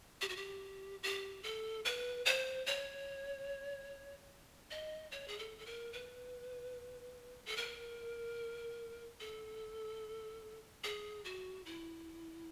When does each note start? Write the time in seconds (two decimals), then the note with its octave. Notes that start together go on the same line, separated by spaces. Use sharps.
0.21 G4
0.29 F#4
0.36 G4
1.03 G4
1.43 A4
1.85 B4
2.26 C5
2.66 C#5
4.71 D#5
5.12 C#5
5.28 G#4
5.39 A4
5.59 A4
5.66 A#4
5.93 B4
7.46 A4
7.57 A#4
9.20 A4
10.84 G#4
11.25 F#4
11.66 E4